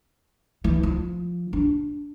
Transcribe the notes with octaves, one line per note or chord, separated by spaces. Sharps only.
E3
F3
D4